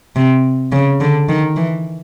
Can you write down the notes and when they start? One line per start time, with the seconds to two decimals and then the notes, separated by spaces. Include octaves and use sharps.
0.16 C3
0.72 C#3
1.01 D3
1.29 D#3
1.56 E3